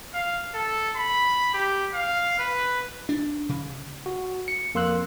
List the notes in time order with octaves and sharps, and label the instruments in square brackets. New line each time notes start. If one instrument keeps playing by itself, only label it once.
[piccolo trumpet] F5
A4
B5
G4
F5
B4
[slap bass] D4
C#3
[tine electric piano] F#4
C#7
F2 A#3 C6 E6 F#6